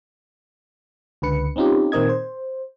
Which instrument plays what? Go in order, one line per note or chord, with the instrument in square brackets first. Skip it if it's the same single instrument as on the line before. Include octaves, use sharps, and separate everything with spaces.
[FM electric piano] C#2 D3 B4 C#7
C4 C#4 D#4 F4 G4
A#2 D#3 C4 A#4 D#5 G#6
C5